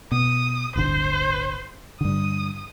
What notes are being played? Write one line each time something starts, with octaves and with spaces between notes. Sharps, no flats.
B2 D#6
D1 G1 D3 C5
G2 D3 D#6